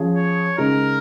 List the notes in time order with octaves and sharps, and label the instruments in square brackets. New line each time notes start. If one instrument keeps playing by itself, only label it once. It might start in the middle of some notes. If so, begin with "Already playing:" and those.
Already playing: [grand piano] F3 C#4 G#4
[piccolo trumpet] C#5
[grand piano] C#3 G#3 D#4 G#4 [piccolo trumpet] A#4